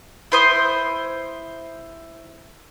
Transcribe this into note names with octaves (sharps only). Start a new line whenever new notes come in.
E4 C5 D#6